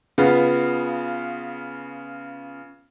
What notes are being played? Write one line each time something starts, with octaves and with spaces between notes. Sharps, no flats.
C#3 B3 F4